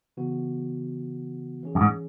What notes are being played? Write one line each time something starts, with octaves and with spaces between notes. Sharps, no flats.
C#3 E3 B3 F#4
E3 C#4 G#4
F#2
G#2